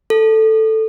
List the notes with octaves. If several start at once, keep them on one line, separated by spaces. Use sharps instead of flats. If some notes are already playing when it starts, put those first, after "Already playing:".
A4